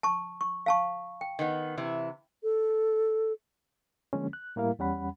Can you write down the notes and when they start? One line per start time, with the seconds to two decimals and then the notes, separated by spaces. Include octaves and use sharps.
0.03 A5 C#6
0.41 C#6
0.66 F5 A5 C#6
1.21 G5
1.39 D#3 B3
1.77 C3 E3 E4
2.43 A4
4.13 D3 F3 G#3 A#3 C#4
4.33 F#6
4.56 A2 G3 A#3 E4 A#4 F5
4.79 E2 G3 C#4 F#5 B5